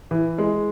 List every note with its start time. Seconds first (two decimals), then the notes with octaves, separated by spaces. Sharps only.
0.11 E3
0.38 G#3